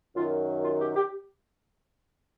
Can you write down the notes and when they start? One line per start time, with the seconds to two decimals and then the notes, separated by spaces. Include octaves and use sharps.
0.16 F#2 D#3 F#3 F4
0.64 F4
0.79 G4
0.95 G4